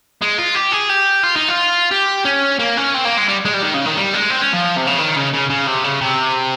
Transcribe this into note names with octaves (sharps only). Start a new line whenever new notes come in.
G#3
F4
G4
G#4
G4
F4
D#4
F4
G4
C#4
A#3
C#4
C4
A#3
G#3
G3
G#3
G3
D#3
C#3
D#3
G3
G#3
C4
C#4
F3
C3
C#3
D#3
C#3
C#3
C#3
C3
C#3
C3